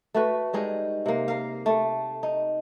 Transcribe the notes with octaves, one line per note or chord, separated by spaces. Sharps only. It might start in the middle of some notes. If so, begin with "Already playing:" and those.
A3 F#4 B4
G3 G#3 D#4 G#4
C3 A#3
A#4 F5
A3
D#4